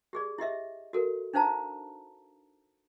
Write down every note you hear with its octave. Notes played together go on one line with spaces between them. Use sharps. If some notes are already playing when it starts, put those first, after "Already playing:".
G4 G#4 D5
E4 G4 D#5 E5
F#4 A4 A#4
D4 D#4 C5 F5 A5 A#5